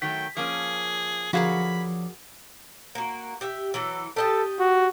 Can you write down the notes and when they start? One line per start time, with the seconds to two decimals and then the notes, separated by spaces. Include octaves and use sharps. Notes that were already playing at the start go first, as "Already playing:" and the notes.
0.02 D#3 F#3 A3 G5 B6
0.37 F3 A#3 C#4 G#4
1.33 D3 F3 F#3 F#4 G#4 A#4 F5 B5
2.95 A#3 F#4
3.41 G4 E5
3.74 E3 F#3 A4
4.16 G4 A4 D#5 A5
4.59 F#4